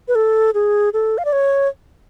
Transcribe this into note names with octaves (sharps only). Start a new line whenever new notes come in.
B4
A4
G#4
A4
F5
D5
C#5